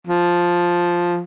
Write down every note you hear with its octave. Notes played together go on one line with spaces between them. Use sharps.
F3